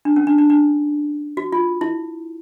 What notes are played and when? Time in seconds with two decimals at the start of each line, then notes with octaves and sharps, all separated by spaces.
0.05 D4
0.16 C#4
0.27 D4
0.38 D4
0.50 D4
1.37 F#4
1.52 F4
1.81 E4